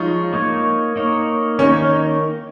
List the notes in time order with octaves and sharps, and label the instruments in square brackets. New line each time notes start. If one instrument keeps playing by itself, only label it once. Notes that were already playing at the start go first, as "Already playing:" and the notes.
Already playing: [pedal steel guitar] F3 G#3 F4 C#5 [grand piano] D#4
[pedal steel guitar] A#3 D#4 C#5
A#3 D#4 C#5
[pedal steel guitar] D#3 A#3 D#4 C#5 [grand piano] C#4